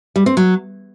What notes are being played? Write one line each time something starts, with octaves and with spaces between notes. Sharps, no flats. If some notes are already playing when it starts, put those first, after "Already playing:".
G3
C4
F#3